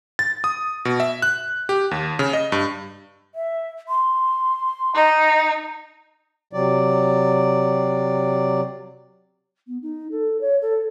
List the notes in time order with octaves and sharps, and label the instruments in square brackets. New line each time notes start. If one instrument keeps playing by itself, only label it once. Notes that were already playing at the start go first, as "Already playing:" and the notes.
[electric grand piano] A6
D#6
B2
E5
F#6
G4
D#2
C#3
D#5
G2
[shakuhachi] E5
C6
[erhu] D#4 [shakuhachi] D#5
[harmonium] C3 F#3 D5
[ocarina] B3
D#4
A4
C#5
A4